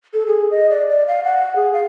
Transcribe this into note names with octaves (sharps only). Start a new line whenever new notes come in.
A4
G#4
D#5
D5
D5
F5
F#5
G#4
F5